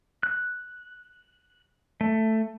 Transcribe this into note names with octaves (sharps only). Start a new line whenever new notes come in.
F#6
A3